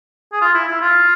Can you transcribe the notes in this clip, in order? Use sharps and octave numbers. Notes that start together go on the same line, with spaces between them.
G#4
F4
E4
E4
F4